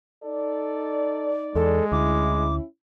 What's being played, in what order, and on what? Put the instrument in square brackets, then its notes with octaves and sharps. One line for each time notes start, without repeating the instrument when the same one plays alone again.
[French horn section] D#4 D5 [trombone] A4
[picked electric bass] E2 [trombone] G#3 [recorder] A4
[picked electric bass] D2 [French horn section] C#4 E4 [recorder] D6